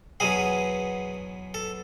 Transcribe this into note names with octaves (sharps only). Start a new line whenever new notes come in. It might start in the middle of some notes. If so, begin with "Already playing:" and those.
E2 B2 F#3 G#4
A4